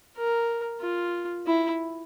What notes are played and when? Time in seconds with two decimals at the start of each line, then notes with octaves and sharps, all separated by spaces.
0.17 A#4
0.81 F4
1.46 E4